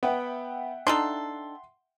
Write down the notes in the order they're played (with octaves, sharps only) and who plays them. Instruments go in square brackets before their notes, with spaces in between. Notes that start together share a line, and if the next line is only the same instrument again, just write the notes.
[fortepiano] B3 [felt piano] E5 F#5 G5
[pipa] D4 D#4 A4 [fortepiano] C6